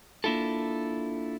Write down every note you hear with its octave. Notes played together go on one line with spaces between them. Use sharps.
A#3 D4 E4 F4 A4